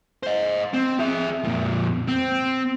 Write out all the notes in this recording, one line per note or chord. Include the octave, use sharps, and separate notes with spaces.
C5 D#5
C4
G#4 E5
F2 A#2
C4